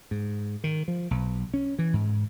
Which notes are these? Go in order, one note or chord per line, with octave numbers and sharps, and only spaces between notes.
G#2
D#3
F3
B1
C#4
E3
G#2